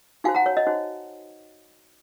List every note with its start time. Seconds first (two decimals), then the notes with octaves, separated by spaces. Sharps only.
0.24 D#4 F#4 C5 F5 G#5
0.35 F#5 A#5
0.46 C#5
0.57 D#5
0.67 D#4 F#4 C5